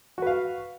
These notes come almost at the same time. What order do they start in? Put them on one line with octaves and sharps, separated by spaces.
F#4 B4 F5